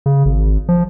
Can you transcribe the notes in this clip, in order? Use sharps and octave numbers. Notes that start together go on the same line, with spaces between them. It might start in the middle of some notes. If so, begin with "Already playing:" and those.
C#3
G#1
F3